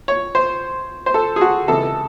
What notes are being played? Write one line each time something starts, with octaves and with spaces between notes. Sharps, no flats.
C#5
C5
C5
A4
G#4
F#4
C#2 C3 E3 A4